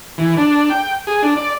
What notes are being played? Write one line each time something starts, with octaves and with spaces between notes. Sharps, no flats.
E3
D4
G5
G#4
D4
D5